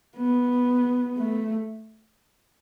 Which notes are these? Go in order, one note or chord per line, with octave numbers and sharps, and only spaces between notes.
B3
A3